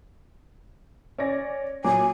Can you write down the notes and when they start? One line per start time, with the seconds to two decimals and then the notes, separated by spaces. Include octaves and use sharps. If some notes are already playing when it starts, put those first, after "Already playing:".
1.18 C#4 D5 A#6
1.84 A#2 F#3 G#5 D6